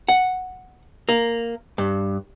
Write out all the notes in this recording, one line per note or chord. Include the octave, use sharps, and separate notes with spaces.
F#5
A#3
G2